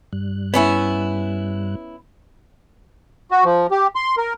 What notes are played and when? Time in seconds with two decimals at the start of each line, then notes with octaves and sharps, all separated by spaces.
0.13 G2 G3 F#6
0.54 B3 C#4 E4
3.31 F#4
3.45 F3
3.71 G4
3.95 C6
4.17 A#4